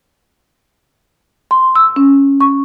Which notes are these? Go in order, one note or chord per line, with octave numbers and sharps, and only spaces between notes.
C6
E6
C#4
C#6